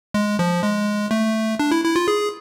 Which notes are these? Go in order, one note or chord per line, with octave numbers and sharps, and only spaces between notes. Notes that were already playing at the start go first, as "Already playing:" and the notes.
G#3
F3
G#3
A3
D4
E4
E4
F4
G#4